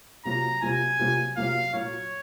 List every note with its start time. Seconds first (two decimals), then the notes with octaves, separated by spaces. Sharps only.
0.25 C3 F#3 A#3 F4 A#5
0.62 C3 F#3 A#3 F4 G#5
0.99 C3 F#3 A#3 F4
1.37 C3 F#3 A#3 F4 F5
1.73 A#2 F#3 A#3 F4 C#5